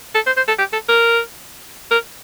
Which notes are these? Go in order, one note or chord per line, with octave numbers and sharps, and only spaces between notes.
A4
C5
C5
A4
G4
A4
A#4
A#4